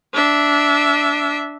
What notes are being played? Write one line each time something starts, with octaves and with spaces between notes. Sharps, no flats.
D4 E5